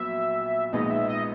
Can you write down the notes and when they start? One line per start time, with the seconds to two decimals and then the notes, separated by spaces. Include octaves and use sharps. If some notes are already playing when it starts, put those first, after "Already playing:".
Already playing: A#1 A#2 F#3 B3 E5
0.73 A#1 A#2 G#3 B3 D#4 D#5
0.91 E5
1.08 D#5